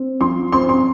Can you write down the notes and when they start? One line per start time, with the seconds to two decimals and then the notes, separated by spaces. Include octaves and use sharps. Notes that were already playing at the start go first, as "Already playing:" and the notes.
Already playing: C4
0.21 F3 C6
0.52 C4 C6
0.69 C6